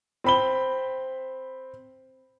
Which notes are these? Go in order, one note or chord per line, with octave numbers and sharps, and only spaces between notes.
C4 B5 G7